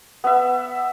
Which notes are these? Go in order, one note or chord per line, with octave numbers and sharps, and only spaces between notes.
B3 E5